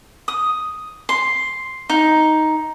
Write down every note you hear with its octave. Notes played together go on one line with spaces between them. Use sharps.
D#6
C6
D#4